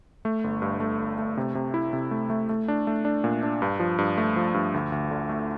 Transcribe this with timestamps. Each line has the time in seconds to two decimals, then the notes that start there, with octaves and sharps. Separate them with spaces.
0.25 A3
0.44 G1
0.62 G2
0.80 A3
0.99 G1
1.18 A3
1.37 C3
1.55 C3
1.74 E4
1.93 C3
2.11 A3
2.30 A3
2.49 A3
2.68 D4
2.87 A3
3.05 D4
3.24 A#2
3.43 D4
3.62 G2
3.79 F3
3.98 G2
4.18 A3
4.36 F3
4.54 G2
4.74 D2
4.92 D2
5.11 D3
5.29 A3